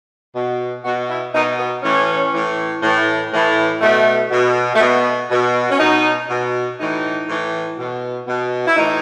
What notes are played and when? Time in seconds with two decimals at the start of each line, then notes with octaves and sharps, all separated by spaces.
0.35 B2
0.84 B2 F#4
1.09 E4
1.33 B2 D#4
1.58 B3
1.83 A2 E3 C#4
2.32 A2 E3
2.82 A2 E3
3.32 A2 E3
3.81 B2 A3
4.31 B2
4.74 A3
4.80 B2 B3
5.31 B2
5.70 C#4
5.79 B2 D#4
6.29 B2
6.79 A2 E3 D#4
7.28 A2 E3
7.77 B2
8.27 B2
8.66 E4
8.76 A2 E3 D#4